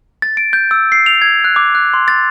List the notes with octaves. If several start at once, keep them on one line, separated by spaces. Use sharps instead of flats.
A6
D7
G6
E6
C7
F7
G#6
F#6
D6
F#6
C6
A6